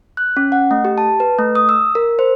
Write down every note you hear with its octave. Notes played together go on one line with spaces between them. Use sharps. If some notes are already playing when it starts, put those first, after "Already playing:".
F#6
C#4
F#5
A3
G4
A5
B4
A3
D#6
E6
A#4
C5